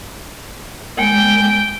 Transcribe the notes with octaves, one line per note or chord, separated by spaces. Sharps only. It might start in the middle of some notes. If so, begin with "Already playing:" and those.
G#3 G5